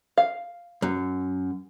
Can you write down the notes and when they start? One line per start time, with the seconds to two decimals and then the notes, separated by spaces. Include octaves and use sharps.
0.18 F5
0.82 F#2